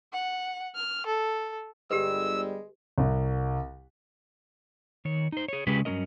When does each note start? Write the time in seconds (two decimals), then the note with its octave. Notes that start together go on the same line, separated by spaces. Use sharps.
0.13 F#5
0.75 F6
1.07 A4
1.91 G1 G3 G#3 G4 A4 B4 E6
2.98 C2
5.05 D#3 C#5
5.32 D#4 C5
5.48 G#4 C#5
5.67 C#3 G#3 C#4 G4 G#4 B4
5.85 G2 F#3 G3 C#4 A#4 D#5